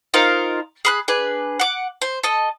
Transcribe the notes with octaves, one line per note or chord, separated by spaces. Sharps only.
D#4 F4 A#4 C5
G#4 B5 F#6
D4 G#4 B4
F#5 D6
C5
A4 D#5